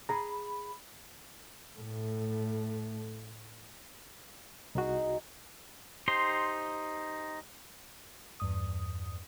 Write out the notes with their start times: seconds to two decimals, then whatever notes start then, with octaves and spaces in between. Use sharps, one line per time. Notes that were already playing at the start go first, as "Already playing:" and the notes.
0.09 G#4 A#5 B5
1.79 A2 A3
4.75 C2 D#4 F#4 G#4 G#5
6.08 D#4 G4 C5 C6
8.40 E2 G2 D#6